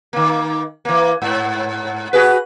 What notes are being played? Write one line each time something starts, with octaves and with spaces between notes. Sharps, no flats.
D#3 A#3
E3 A#3
G#2
F#4 G#4 B4